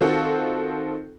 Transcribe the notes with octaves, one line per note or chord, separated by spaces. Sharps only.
D#3 C4 F4 F#4 A4